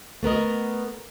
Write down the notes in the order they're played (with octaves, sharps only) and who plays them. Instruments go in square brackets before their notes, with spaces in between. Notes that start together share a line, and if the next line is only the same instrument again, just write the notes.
[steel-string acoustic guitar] A3 B3 A#4 D#5